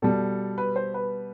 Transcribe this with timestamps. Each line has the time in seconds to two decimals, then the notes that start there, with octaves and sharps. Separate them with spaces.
0.02 B2 G3 A4
0.58 B4
0.76 C5
0.94 B4